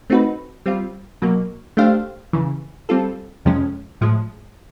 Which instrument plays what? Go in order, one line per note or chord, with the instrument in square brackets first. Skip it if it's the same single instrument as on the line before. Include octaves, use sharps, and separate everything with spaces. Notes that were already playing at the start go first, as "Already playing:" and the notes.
[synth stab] A3 C4 D#4 F#4 B4
G3 C4 F4
B2 F#3 A#3
A3 D4 G4 C5 F5
E2 C#3 E3
G3 C4 F4 A4
F2 C3 F3 G#3 C#4
A2 F3 G#3